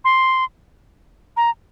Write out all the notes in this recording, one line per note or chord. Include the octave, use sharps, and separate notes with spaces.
C6
A#5